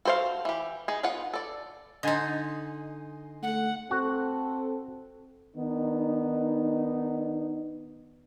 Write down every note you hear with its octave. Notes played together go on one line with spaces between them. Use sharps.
F#4 A4 C5 D5 F5
E3 G4
D#4 G#4
D#3 B3 F4 F#5
A4 D5
D3 D#4 D#5 G#5 C6
A3 F#5
C4 F#4 A4
D#3 B3 D4 D#4